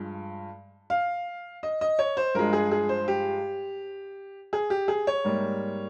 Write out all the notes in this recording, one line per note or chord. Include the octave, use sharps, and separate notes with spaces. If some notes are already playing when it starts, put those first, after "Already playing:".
Already playing: G2 F3 G#3
F5
D#5
D#5
C#5
C5
G2 F3 G#3 A#4
G#4
G#4
C5
G4
G#4
G4
G#4
C#5
G#2 G3 A#3